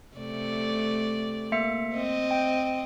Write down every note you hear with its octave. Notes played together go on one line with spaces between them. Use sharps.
C3 A3 D5
A#3 E5 C#7
C4 D#5
G5